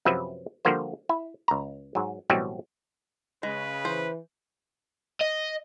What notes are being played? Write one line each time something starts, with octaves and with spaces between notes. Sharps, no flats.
F#2 C3 F3 F#3 B4 E5
D3 F3 G3 A#3 F#4 C5
E4
C#2 A#5
G#2 F#3
A1 B2 F#3 G3 C4 E4
C#3 G#3 B4
E3 C5
D#5